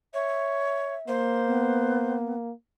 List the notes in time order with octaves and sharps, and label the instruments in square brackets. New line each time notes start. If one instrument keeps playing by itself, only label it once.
[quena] C#5 [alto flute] E5
[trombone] A#3 [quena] C5
[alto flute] B3